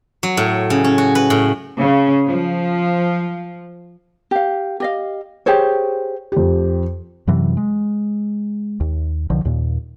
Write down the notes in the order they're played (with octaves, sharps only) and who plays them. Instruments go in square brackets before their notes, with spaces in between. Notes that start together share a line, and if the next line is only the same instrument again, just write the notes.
[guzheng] F#3
A2
C#3
C#4
F#4
B4
A2
[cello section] C#3
F3
[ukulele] G4 F5
G4 D#5 F5
G4 G#4 C5 C#5
[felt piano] F2 G4
[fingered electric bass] F#2 C3 E3 F#3
G#3
D#2
B1 D3 F3
D#2 A#2